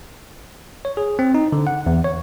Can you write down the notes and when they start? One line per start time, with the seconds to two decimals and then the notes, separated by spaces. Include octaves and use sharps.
0.85 C#5
0.97 G#4
1.19 C4
1.34 D#4
1.52 D3
1.67 F#5
1.86 E2
2.04 C#5